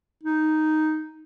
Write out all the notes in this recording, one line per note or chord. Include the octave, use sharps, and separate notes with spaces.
D#4